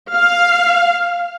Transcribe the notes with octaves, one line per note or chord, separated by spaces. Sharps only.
F5